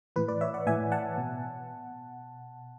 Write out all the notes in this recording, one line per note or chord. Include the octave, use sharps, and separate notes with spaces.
A2 E3 B4
B4 D5
C#5 E5
D5 F#5
A2 E3 E5 G#5
F#5 A5
B2